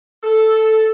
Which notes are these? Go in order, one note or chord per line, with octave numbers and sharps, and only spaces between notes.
A4